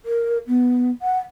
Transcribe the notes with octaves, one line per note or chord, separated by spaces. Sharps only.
A#4
B3
F#5